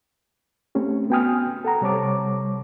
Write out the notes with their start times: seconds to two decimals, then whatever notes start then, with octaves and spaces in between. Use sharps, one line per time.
0.75 A3 C4 C#4 G4
1.10 B3 F#4 G5 G#5 D#6 F6
1.65 A4 F#5 A#5
1.81 C3 G3 C5 C#5 A5 D6